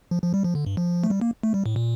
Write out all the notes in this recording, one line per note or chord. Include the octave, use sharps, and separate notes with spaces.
F3
F3
G3
F3
D3
G2
F3
A3
G3
A#3
A3
G3
A2
A#2